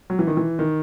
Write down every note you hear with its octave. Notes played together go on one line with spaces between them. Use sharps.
F#3
E3
D#3
E3
D#3